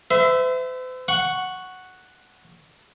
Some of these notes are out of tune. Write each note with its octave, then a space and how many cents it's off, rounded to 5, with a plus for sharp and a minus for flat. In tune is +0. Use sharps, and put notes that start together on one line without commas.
C5 -45 E5 +0
F#5 +0 C#6 +0